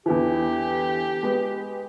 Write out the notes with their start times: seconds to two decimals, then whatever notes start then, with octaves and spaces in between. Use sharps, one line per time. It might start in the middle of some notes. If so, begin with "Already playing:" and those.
0.06 E2 D3 E3 G4
1.23 G#3 B3